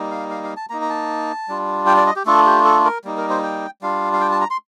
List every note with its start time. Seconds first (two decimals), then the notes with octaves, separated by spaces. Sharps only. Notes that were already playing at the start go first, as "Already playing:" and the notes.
Already playing: G3 A#3 D#4
0.11 F5
0.30 F5
0.44 F5
0.57 A5
0.70 A#3 D#4 A#5
0.82 A#5
0.90 A5
1.48 G3 D4 F4
1.86 G5
1.97 D5
2.07 D#5
2.16 G4
2.26 A3 D4 F4 A4
2.46 G4
2.65 A4
2.85 A#4
3.04 G3 A#3 D#4
3.17 A#4
3.30 C5
3.43 G5
3.82 G3 D4 F4 F5
4.13 F5
4.21 G5
4.31 A5
4.41 A#5
4.50 C6